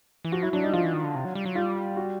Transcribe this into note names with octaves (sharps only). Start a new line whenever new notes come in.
E3
F3 F#4
F#3 E4
F#3 D4
G3 D#4
F3 F4
E3
D#3
D3
C3
F#3
G3
F#3
G3 F4
F#4